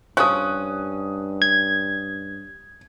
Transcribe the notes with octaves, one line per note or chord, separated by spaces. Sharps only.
G2 F3 C#4 D#6 F#6
G#6